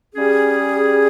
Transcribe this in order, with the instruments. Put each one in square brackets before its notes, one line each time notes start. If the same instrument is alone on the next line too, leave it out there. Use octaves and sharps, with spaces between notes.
[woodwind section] G3 C#4 G#4